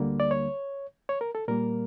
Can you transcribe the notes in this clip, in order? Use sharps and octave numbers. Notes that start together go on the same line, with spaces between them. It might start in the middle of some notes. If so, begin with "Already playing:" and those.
Already playing: D2 D3 G3 A#3
D5
C#5
C#5
A#4
A4
A#2 G3 A#3 A#4